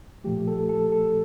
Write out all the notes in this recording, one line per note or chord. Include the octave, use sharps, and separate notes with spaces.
A#2 F3 A3 G4
A4
A4
A4